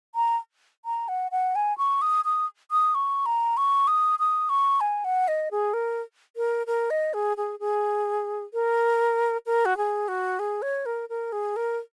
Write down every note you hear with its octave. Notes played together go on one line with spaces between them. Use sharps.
A#5
A#5
F#5
F#5
G#5
C#6
D#6
D#6
D#6
C#6
A#5
C#6
D#6
D#6
C#6
G#5
F#5
D#5
G#4
A#4
A#4
A#4
D#5
G#4
G#4
G#4
A#4
A#4
F#4
G#4
F#4
G#4
C#5
A#4
A#4
G#4
A#4